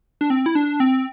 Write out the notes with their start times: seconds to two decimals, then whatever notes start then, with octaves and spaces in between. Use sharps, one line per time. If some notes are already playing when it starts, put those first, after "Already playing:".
0.21 D4
0.30 C4
0.46 E4
0.55 D4
0.80 C4